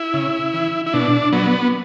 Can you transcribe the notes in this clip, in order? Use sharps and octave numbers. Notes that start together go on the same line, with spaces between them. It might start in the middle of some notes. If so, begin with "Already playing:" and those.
Already playing: E4
C#3
E3
E4
B2 D4
F#3 B3